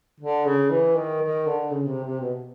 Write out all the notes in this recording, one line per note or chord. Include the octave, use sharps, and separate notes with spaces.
D3
C#3
E3
D#3
D#3
D3
C#3
C3
C3
B2